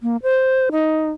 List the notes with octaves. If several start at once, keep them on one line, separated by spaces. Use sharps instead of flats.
A#3
C5
D#4